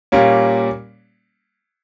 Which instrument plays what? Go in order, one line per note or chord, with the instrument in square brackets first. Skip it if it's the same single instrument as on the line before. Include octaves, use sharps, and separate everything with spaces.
[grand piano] A#2 G3 A#3 C#4